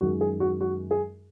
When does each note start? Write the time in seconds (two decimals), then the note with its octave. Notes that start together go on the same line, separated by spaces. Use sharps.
0.01 F#2 D#3 G#3 F#4
0.21 G#4
0.40 F#4
0.61 F#4
0.91 G#4